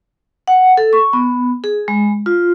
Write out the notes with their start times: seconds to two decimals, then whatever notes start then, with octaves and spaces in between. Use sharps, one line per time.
0.48 F#5
0.77 A4
0.93 C#6
1.13 B3
1.64 G#4
1.88 G#3
2.26 F4